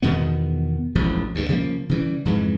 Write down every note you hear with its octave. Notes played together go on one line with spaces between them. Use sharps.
E2 B2 D#3 B3
E1 A1 F2 F3
D2 G2
C#3 F3 G3 A#3
C#3 E3 G3
F2 G#2 C#3 E3